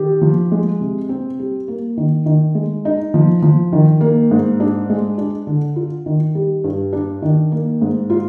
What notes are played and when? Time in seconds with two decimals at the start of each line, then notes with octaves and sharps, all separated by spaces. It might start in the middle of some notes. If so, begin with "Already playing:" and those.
Already playing: D#3 G4
0.21 F3
0.52 G#3
0.81 C3
1.09 C4
1.39 G3
1.68 A#3
1.97 D#3
2.26 D#3
2.55 G#3
2.85 D#4
3.14 F3
3.42 F3
3.73 D#3
4.01 A#3
4.31 G#2
4.60 D4
4.90 G#3
5.18 D4
5.47 D3
5.76 F4
6.06 D#3
6.35 G3
6.64 G2
6.93 D4
7.22 D#3
7.52 A#3
7.82 G#2
8.10 F4